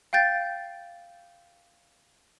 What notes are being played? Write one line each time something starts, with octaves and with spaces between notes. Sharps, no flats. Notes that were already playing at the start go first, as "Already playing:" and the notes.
F5 G5 G6 A6